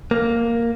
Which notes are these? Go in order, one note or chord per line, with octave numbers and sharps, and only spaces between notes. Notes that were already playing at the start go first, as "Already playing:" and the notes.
A#3